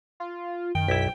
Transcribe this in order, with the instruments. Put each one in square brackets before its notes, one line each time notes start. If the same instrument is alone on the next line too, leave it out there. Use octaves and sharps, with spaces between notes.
[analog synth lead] F4
[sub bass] F#2 [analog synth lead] D#3 [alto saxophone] G5
[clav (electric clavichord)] B1 E4 [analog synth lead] B6